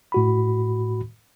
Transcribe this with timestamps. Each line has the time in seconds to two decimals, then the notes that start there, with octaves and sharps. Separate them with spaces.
0.12 A2 F#4 B5